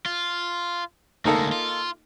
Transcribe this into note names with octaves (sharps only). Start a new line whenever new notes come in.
F4
D2 G#3 A#3 D#4 A4
F4